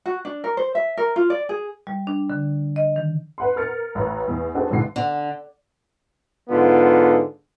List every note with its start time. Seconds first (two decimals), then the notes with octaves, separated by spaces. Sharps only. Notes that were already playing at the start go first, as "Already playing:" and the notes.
0.06 F#4
0.25 D4
0.44 A#4
0.57 C5
0.75 E5
0.97 A#4
1.16 F4
1.30 D5
1.49 G#4
1.87 G3
2.07 D4
2.30 D3
2.76 D#5
2.96 D#3
3.38 B4 F#5 C6
3.56 A#4 F6 A6 C#7
3.95 A1 B4 C#5 A#5
4.28 E2
4.55 C4 D4 F#4 G#4 A4 B4
4.70 G#1 C#2 A2 D3 C7
4.96 D3
6.49 G#2 D3 B3 F4